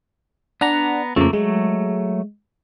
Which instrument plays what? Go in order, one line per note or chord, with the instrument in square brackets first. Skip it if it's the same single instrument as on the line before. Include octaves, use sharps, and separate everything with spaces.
[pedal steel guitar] B3 A#5 [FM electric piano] D4 F#5
[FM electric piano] F2 C#3 F3 [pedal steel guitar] A3 A#3
[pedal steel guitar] F#3 A3 [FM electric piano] G#3